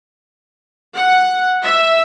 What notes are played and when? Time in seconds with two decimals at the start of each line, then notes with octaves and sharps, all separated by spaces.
0.97 F#5
1.63 E5